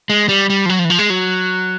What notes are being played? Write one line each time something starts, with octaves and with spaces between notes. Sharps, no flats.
G#3
G3
G3
F3
F#3
F3
E3
F3
G#3
F#3